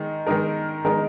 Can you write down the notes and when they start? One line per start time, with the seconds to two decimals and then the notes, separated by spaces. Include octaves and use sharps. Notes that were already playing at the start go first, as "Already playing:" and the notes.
Already playing: D#3 G#3 D#4
0.26 D#3 G#3 D#4 A#4
0.85 D#3 G#3 D#4 A#4